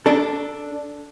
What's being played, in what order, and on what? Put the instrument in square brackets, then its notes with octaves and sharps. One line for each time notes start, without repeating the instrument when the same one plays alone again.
[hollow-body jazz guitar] D4 A4